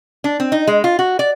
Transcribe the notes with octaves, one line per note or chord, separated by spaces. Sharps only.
D4
C4
D#4
G#3
F4
F#4
D5